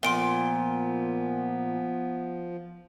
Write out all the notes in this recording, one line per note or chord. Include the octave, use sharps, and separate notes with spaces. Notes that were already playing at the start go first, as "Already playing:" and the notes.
A#2 F3 B3 C6 D7 G7